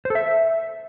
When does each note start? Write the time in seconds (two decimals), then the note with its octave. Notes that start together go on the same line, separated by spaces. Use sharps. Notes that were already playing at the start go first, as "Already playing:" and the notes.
0.05 C5
0.10 A4
0.15 E5